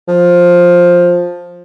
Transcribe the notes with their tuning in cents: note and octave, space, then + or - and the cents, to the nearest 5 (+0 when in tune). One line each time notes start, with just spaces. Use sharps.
F3 +10